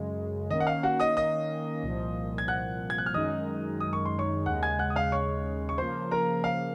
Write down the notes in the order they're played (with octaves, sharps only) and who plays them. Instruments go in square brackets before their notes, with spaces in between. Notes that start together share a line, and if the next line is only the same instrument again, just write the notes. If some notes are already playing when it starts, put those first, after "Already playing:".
Already playing: [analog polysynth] F#2 C#3 G#3
[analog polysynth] D#3 A#3 C#4 [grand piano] D#5
[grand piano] F#5
F5
F#4 F#5
D#5 D#6
D#5 D#6
[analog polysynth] C2 A#2 F3
[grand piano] G#6
F#5 F#6
G#6
F#6
F6
[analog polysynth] F#2 D#3 G#3 D#4 [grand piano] D#5 D#6
[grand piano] D#6
C#6
C6
C#5 C#6
[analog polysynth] D#2 C#3 G#3 [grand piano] F#5 F#6
[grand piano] G#5 G#6
F#5 F#6
D#6
F5 F6
C#5 C#6
C#6
[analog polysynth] C#3 F3 A#3 [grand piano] C5 C6
[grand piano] A#4 A#5
F5